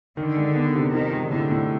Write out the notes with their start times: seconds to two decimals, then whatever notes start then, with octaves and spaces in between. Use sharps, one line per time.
0.17 D3 D#3
0.37 G#3
0.55 B3
0.75 C3
0.94 D#3 F3
1.12 G#3
1.32 A2 D3
1.51 A2